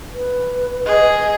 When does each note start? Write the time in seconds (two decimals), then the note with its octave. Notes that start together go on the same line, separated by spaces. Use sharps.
0.13 B4
0.86 G#4 D#5